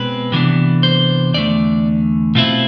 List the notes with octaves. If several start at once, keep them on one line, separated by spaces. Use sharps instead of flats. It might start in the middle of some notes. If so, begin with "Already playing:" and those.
Already playing: B2 G#3 C4 B4
C3 E3 B3 D4
C5
E2 D3 A3 D5
B2 A3 C4 E4 F4